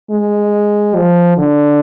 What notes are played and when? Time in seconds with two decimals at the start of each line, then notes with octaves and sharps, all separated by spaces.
0.11 G#3
0.95 F3
1.38 D3